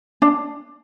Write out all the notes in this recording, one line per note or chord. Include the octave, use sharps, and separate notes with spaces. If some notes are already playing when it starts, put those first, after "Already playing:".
D4